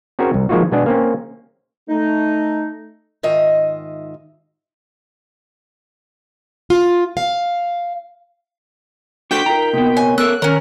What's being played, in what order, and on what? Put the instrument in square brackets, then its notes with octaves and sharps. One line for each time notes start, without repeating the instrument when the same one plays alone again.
[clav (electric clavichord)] C4 C#4 F#4 G#4 A#4 C#5
C2
F3 G#3 A#3 D#4 F4 F#4
B2 G#3 B3 D4 G#4
A#3 C4 C#4
[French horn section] A3 [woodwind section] D#4
[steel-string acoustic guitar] G#2 D#3 F4 D#5 E5
F4
F5
[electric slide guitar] D4 F#4 A4 [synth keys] G5 G6 B6
[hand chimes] D#4 F4 A#4 [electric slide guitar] A#5
[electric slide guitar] C3 B3 [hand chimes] A#3 A#4
[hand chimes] C#5 F#5 [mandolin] G#5
[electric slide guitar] B3 A4 A#4 [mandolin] E6 [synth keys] F#6
[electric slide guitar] D#3 [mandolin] C#4 A#4 [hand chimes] C#5